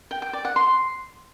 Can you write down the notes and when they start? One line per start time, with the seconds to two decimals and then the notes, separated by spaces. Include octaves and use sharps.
0.11 G5
0.22 G5
0.33 D5
0.45 F#5
0.56 C6